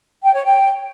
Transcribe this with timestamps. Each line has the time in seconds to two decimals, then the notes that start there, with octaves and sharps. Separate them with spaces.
0.23 G5
0.34 C#5
0.45 G5